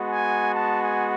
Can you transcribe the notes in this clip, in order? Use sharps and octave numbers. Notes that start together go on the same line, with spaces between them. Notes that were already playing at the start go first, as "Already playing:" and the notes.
Already playing: G#3 B3 F#4
G#5
A5
G#5